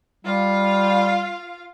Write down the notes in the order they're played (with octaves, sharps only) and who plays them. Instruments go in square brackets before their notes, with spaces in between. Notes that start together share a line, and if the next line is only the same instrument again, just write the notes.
[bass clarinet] G3 [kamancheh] F4 F5